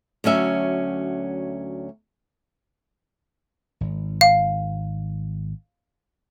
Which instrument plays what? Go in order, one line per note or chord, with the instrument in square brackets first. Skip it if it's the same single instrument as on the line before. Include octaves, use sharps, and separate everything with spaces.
[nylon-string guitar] D2 F#3 C#4 E5
[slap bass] G#1
[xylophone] F5